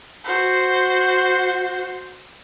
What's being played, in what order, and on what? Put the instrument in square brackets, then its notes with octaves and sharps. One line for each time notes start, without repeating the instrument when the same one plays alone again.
[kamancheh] F#4 C5